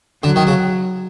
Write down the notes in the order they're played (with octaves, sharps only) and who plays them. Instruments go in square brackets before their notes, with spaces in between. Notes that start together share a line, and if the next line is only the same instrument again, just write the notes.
[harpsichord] D3 [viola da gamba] F#3
[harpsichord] D#3
C#3